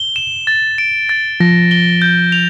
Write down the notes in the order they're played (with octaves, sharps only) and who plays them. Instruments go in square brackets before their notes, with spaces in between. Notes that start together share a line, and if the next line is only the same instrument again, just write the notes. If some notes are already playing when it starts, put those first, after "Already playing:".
Already playing: [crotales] G7
E7
A6
D7
A6
[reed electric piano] F3 [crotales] A#6
[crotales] G7
G6
F7